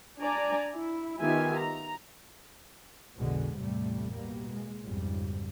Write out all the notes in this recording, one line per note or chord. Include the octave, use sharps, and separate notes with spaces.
D4 D5 G#5 A#5
E4
D#3 B3 F4 G4 E5 G#5
A#5
B1 F2 B2 D3 G#3
A1 E2 G2 C3 G3 A3
B2 G3 A#3
G#3
B1 F2 G#2 C#3 G3